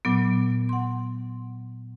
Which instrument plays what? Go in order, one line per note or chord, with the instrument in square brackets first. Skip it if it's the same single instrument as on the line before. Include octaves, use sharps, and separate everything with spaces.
[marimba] A#2 F#3 B3
F#5 C6